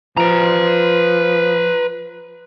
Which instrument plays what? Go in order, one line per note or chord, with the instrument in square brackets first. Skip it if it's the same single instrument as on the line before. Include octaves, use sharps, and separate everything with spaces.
[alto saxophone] F3 [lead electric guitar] B4 A#5